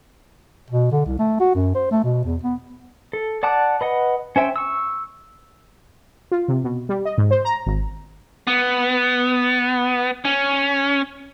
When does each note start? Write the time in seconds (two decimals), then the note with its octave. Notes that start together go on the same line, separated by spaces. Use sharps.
0.70 B2
0.92 D3
1.06 C2
1.19 A3
1.40 F#4
1.55 F#2
1.75 C5
1.91 A3
2.04 B2
2.25 E2
2.43 B3
3.13 A4
3.43 D5 F#5 A5 D6 F#6
3.81 B4 D#5 F#5
4.36 C#4 C5 E5 G5
4.56 C#6 E6
6.32 F4
6.48 C3
6.64 B2
6.89 G3
7.05 D#5
7.18 G#2
7.31 C5
7.45 A#5
7.66 G#1
8.47 B3
10.25 C#4